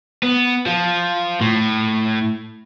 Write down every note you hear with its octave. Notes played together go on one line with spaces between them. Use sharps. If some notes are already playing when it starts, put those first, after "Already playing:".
B3
F3
A2